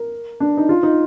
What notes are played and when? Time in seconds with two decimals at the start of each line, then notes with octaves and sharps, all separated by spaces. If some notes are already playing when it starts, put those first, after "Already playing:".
Already playing: A#4
0.40 D4
0.57 D#4
0.69 F4
0.83 D#4